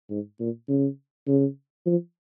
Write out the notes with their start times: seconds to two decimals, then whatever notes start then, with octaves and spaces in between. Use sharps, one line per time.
0.10 G#2
0.40 A#2
0.69 C#3
1.28 C#3
1.86 F3